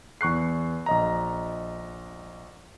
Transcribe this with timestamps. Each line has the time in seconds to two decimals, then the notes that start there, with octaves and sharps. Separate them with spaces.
0.21 E2 C#6 F#6 C7
0.86 A#1 D#5 A#5